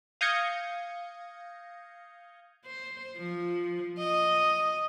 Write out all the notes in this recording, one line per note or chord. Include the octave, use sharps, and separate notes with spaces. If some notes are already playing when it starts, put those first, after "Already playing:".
F5 D#6 G6 G#6 A#6 C#7
C5
F3
D#5